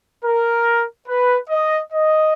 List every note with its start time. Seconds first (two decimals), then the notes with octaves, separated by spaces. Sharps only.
0.25 A#4
1.08 B4
1.50 D#5
1.93 D#5